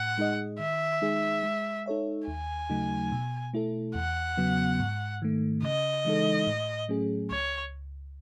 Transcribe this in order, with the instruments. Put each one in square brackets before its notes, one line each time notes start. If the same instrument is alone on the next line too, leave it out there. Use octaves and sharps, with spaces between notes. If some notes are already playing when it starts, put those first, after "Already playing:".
Already playing: [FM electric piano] A2 [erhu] F#5
[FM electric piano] G#3 D#4 G#4 D#5
[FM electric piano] D#3 [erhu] E5
[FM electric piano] G#3 D#4 G#4
G#3
D#4 A4 C#5 E5
[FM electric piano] D#2 [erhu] G#5
[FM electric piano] C#3 F#3 A3 D#4
B2
A3 E4 A4
[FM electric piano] E2 [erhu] F#5
[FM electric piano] C#3 F#3 B3
G#2
D#3 A3
[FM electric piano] C#3 [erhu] D#5
[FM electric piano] E3 G#3 D#4 A4
A2
F#3 A3 C#4 G#4
[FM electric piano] C#2 [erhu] C#5